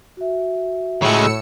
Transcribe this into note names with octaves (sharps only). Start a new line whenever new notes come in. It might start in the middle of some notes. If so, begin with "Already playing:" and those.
F#4 E5
A2 C#3 G#3 E6 C#7